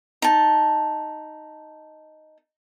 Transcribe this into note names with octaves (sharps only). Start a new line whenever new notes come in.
D#4 A5